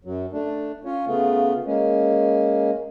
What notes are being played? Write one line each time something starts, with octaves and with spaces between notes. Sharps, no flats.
F#2 F#3
A3 D4
C#4 F4 C#5
C#3 A3 B3 F4
G#3 A#3 C#4